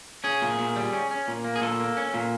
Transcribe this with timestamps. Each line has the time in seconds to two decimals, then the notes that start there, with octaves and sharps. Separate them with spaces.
0.24 C#4 G#4
0.42 A#2
0.59 A#2
0.76 G3
0.93 C#4
1.11 C#4
1.28 A#2
1.44 A#3
1.56 G#4
1.62 A#2 A4
1.80 A#3
1.97 C#4
2.14 A#2